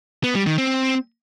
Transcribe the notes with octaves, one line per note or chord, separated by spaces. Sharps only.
B3
G3
D#3
C4